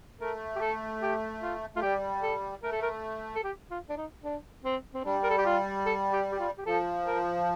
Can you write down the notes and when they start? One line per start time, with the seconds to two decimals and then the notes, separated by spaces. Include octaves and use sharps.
0.20 A3 A#4
0.56 G4
0.61 A4
1.01 G4
1.42 F4
1.76 A3 F4
1.82 G3 G4
2.22 A4
2.63 A3 A#4
2.72 A4
2.82 A#4
3.35 A4
3.43 G4
3.70 F4
3.89 D4
3.97 D#4
4.24 D4
4.64 C4
4.94 C4
5.05 G3 D4
5.23 A#4
5.30 A4
5.38 G4
5.45 F4
5.85 A4
6.12 G4
6.32 G4
6.39 F4
6.58 G4
6.66 F3 A4
7.06 A#4